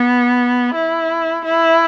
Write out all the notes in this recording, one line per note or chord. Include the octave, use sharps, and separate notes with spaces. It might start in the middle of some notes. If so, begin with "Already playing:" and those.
Already playing: B3
E4
E4